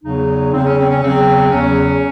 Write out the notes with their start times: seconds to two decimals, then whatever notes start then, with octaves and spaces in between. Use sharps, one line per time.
0.04 E2 C#3 F#3 D#4
0.52 E2 C#3 F#3 C4
0.66 C#4
0.78 C4
0.90 C#4
1.02 E2 C#3 F#3 C4
1.51 E2 C#3 F#3 C#4